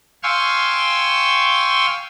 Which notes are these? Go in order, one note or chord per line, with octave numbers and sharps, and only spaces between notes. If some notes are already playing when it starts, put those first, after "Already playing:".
F5 G5 G#5 C6 C#6 E6